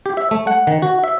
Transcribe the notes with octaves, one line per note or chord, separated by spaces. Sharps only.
G4
E5
A3
F#5
D#3
F#4
E5